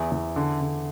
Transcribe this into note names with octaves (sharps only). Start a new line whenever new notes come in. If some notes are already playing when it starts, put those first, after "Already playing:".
Already playing: E2 E4
E2
D3
D3